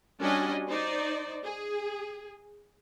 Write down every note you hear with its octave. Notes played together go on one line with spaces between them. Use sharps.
G3 C#4 D4 F#4 D#5 G#5
D#4 C5 D5
G#4